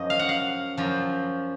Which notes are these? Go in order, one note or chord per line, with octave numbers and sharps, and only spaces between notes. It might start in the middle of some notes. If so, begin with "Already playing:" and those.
Already playing: F#2 F3 D#5
F5
F#5
F5
F#2 F3